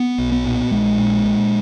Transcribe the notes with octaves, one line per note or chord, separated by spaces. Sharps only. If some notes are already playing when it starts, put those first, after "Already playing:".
Already playing: B3
B1
B3
A#2
A#1 G#3
A#2
A#2